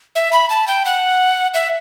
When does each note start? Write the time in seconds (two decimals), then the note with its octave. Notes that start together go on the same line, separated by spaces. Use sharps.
0.15 E5
0.33 B5
0.50 A5
0.67 G5
0.85 F#5
1.54 E5